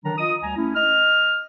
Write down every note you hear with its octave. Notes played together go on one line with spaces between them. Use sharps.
D3 D#3 F#3 D4 A#5
F4 D#5 D#6
D2 G3 G#5 A#5
A3 C#4 E4
D#5 F6